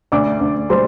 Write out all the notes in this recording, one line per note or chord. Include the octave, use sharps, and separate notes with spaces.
D2 D5 D6
D2
G3 C5 C6